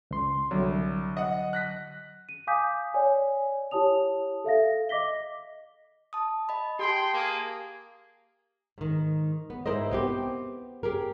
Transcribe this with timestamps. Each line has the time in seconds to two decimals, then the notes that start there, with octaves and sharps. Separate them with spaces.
0.11 C#2 C6
0.51 C2 D3 F#3
1.17 D#5 F#5
1.53 F#6 A#6 B6
2.29 D#7
2.47 F5 G#5 D6 D#6 G6 B6
2.94 C#5 D5 G#5
3.71 E4 G4 C#5 A5 D#6 F7
4.44 A4 E5 F5 A#6
4.89 D#5 D6 A#6 B6 G7
6.13 A5 D#6
6.49 D#5 B5
6.79 G4 G#4 G5 A5 C6
7.13 A#3 G#4
8.78 G#2 D#3
9.50 B3
9.66 G#2 E4 A#4 C5 D#5
9.91 B3 C4 G4
10.83 G4 G#4 A#4